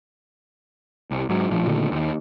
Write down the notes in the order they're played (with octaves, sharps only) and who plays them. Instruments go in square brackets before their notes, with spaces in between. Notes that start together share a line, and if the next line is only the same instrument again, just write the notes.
[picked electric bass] C2
G#2 F#3
A#1 A2 F3
A#2 D3 D#3 A3
D#2 D#3